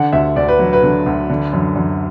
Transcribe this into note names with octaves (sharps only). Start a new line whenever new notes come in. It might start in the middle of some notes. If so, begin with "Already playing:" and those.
Already playing: D3 F#5
D2 E5
D2 D5
B4
F#3
B4
D3
D2
D3
F#2
F#2